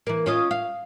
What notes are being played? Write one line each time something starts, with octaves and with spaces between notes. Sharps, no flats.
E3 A#3
C#4 F4 D#5
F5